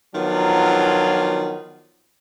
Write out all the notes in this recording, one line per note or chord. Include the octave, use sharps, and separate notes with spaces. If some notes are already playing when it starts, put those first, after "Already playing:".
D#3 F3 F#3 B3 D4 F4